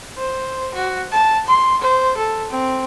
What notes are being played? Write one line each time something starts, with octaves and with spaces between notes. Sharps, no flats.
C5
F#4
A5
C6
C5
A4
C4